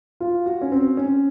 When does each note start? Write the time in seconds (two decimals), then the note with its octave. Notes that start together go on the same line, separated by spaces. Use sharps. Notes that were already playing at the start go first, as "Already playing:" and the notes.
0.20 F4
0.46 F#4
0.61 C#4
0.72 C4
0.97 C#4